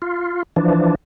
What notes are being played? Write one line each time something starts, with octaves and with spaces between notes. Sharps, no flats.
F4
E3 F3 D4